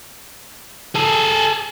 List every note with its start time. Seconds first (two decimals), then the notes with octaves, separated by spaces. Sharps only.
0.95 G#4 A4